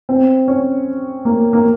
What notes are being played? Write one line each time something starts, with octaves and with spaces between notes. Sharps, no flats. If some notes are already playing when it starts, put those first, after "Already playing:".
C4
C#4
A#3
A#3